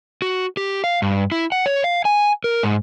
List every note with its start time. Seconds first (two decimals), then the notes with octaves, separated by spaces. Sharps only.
0.22 F#4
0.57 G4
0.84 F5
1.02 G2
1.32 E4
1.52 F#5
1.66 C#5
1.84 F5
2.05 G#5
2.44 A#4
2.63 G#2